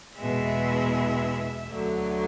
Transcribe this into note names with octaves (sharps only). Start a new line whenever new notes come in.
E2 B2 G#3 E5
D2 D3 F#3